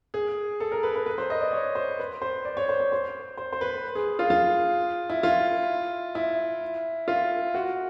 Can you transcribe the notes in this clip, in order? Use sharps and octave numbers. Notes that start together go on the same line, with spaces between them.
G#4
A4
A#4
B4
B4
B4
C5
D#5
D5
C#5
C5
B4
C5
D5
C#5
C5
C#5
C5
C5
C5
B4
G#4
F4
F4
E4
F4
E4
F4
F#4